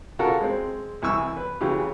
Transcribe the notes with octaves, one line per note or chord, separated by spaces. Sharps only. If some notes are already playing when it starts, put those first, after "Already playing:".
C#3 F4 F#4 A4 A#4
G#3 C4
C2 E3 G#5 C#6 E6
B4
C#3 E3 F#3 G4